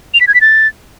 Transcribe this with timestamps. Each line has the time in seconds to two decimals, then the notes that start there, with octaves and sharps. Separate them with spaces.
0.14 F7
0.21 B6
0.28 G#6
0.34 B6
0.41 A6